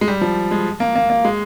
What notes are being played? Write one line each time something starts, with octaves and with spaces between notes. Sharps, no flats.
G#3
G3
F3
G#3
A#3
A#3
A#3
G#3